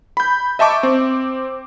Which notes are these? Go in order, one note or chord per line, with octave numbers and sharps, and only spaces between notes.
B5 G6
D#5 E5 A5 C#6 D6
C4